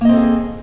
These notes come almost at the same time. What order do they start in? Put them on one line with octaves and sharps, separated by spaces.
A#3 D#5 C4 A4 G#4